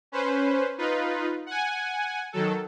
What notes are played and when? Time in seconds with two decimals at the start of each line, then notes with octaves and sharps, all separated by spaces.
0.12 C#4 B4 C5
0.78 D#4 F4 B4
1.46 F#5 G#5
2.33 D#3 F#3 A4